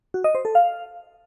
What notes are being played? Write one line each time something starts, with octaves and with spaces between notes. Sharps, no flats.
F#4
D#5
C5
A4
F5